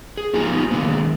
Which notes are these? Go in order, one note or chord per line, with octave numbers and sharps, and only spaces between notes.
G#4
F2 F3 A#3 D#4 G4 G#5
B3 D#4 F4
D3 D#3 F3 G#3 A#3 B3